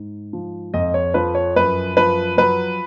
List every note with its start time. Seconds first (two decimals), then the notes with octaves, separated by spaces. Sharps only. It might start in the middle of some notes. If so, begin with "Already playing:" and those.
Already playing: G#2
0.33 F3
0.74 F2 D#5
0.94 C#5
1.14 F3 B4
1.35 C#5
1.56 F#2 B4
1.97 F3 B4
2.37 F#3 B4